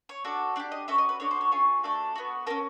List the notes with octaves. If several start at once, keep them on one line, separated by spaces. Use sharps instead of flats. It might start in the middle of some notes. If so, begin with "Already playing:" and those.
C#5
D4 F#4 A4
D4 G4 D5
D#5
C#4 F#4 A4 E5
D#5
B4
D4 F#4 A4 C#5
C5
C#5
C#4 F4 G#4 C#5
A3 D4 F#4 A4
B3 D4 F#4
C#4 F#4 A4 A#4